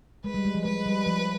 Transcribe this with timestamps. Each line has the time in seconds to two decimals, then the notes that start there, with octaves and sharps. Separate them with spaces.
0.24 G#3 B4
0.34 G3
0.45 G#3
0.55 F3
0.65 G#3 B4
0.86 G3
1.06 F3